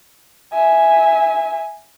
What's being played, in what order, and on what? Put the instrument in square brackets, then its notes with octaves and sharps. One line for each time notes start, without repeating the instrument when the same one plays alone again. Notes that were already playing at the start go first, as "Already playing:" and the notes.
[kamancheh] E5 G#5